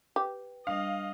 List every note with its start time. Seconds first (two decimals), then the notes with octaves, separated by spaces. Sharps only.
0.16 G4 B4
0.67 G3 D4 D#5 F5